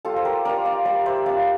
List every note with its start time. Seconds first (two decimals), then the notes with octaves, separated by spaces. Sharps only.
0.05 G3 F4 A4
0.16 C5
0.25 G4 A#4
0.45 D4 F4 A#4 D5
0.65 D5 F5
0.85 G3 D5 F5
1.06 C5 E5
1.26 D4 F4 D5 F5